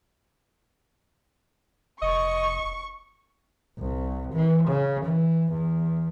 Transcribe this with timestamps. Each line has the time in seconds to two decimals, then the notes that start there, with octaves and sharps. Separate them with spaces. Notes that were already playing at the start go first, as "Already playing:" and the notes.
2.02 F1 D#5 C#6
3.78 C2
4.33 E3
4.68 C#3
5.05 E3
5.53 E2